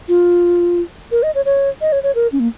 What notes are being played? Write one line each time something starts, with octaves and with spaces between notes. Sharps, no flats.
F4
A#4
D#5
C#5
C#5
D#5
C#5
C#5
A#4
C#4
A#3